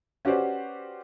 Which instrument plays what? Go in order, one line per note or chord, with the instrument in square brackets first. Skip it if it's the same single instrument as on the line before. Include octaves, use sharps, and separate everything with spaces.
[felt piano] C#4 F#4 G4 B4 C5 D5